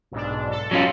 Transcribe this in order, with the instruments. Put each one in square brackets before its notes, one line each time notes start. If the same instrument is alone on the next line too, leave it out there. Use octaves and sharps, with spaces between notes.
[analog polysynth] B1 G#2 D4
A4
[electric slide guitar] F#3 C#4 F4